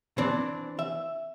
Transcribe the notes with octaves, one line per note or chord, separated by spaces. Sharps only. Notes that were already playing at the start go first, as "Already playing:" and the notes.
E3 C4 D4
E5